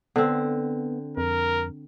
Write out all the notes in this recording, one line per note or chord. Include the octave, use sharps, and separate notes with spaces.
D3 B3 C4
F2 A#4